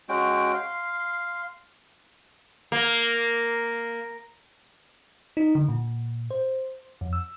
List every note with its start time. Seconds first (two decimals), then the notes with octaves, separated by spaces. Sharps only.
0.09 G#3 C#4 F#4 G5
0.53 F5 C6
2.72 A#3
5.37 D#4
5.55 D3
5.68 A#2
6.31 C5
7.01 F2
7.13 E6